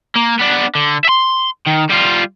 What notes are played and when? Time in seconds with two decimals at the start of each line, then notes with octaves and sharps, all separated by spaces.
0.16 A#3
0.40 B3 D4
0.75 D3
1.05 E5 C6
1.66 D#3
1.89 G3 F4